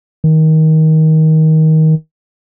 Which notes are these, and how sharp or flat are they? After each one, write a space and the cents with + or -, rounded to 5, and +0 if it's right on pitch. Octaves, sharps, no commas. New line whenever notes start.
D#3 +20